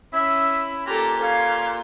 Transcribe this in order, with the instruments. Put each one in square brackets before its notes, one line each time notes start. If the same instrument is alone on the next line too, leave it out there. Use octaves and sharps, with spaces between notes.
[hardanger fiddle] C#4 [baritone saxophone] E4 [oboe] E5
[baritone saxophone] A#2 [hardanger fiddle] G4 A4 [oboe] A#5
[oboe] C#4 [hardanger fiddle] F5